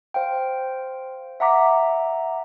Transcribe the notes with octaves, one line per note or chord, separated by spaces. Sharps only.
C5 F5 G5
E5 F#5 A#5 D6 B6